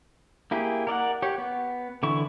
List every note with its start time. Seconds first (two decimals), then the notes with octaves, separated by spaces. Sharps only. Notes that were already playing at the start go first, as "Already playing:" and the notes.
0.51 A#3 E4 G4 G#4
0.87 A#4 D5 D#5 F#5
1.22 G4 C#5
1.38 B3
2.03 D3 E3 E4 C#6